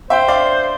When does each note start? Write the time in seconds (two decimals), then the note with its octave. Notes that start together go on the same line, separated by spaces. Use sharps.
0.10 C5 E5 G5
0.28 D5 F5